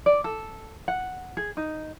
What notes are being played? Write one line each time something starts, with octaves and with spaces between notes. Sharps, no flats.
D5
A4
F#5
G#4
D#4